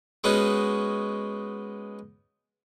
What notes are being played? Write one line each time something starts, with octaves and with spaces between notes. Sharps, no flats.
G#3 B3 C#4 D#4 F#4